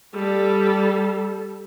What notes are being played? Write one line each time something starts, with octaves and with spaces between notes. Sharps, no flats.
G3 A4